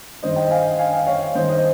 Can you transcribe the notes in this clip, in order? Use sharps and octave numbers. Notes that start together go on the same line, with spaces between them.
G2 D#3 C5 D#5
D#5 G5
F5 G#5
F5 G#5
F5 G#5
C#5 F5
G2 D#3 C5 D#5
C5 D#5